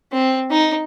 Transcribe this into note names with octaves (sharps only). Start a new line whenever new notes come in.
C4
D#4